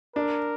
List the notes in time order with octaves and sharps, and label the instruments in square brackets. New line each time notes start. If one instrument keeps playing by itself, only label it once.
[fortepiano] D4 [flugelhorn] A#4